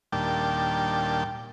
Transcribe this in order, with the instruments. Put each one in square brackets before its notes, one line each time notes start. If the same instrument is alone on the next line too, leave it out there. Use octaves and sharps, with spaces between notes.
[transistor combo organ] D#2 A#2 G3 D4 G5 A5